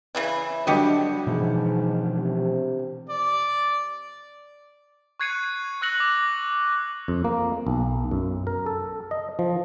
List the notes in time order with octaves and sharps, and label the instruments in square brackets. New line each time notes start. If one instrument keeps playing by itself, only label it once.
[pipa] C#3 E3 E4
[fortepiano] D3 G3 [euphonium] F#3 [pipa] G4 C#5 D#5
[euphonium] G#2 [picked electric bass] B2 E3 F3
[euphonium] C3
[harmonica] D5
[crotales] C#6 F#6 G#6 C7 C#7 D#7
C#6 E6 F#6 A#6 C#7 F#7
D6
[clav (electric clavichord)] F2
A#3
B1
F#2
A#4
A4
D#5
F3